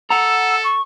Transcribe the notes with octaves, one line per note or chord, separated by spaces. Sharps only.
A4 F#5 A#5 E6
C#6